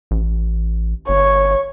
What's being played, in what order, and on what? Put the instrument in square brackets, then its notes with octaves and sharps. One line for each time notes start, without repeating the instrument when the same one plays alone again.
[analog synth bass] A1
[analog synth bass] G1 [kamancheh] C#5